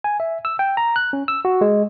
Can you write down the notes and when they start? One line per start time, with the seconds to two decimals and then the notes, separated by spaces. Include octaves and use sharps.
0.04 G#5
0.20 E5
0.45 E6
0.59 G5
0.77 A#5
0.96 F#6
1.13 C#4
1.28 E6
1.45 F#4
1.61 G#3